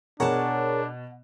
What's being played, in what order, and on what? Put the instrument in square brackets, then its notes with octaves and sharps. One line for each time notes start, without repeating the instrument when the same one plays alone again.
[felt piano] B2 [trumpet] D4 [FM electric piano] G#4 A#4 C#5 [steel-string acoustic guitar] F#5 A5